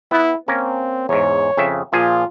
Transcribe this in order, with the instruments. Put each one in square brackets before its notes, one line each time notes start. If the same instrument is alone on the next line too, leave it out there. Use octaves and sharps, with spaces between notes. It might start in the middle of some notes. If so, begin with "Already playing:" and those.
[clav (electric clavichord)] B3 [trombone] E4
[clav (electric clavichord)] A#3 C#4 A#4 [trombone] C4
[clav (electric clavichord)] E2 G#2 [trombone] C#5
[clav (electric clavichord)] F2 C#3 E5
[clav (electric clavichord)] A#2 F3 G#4 [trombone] F4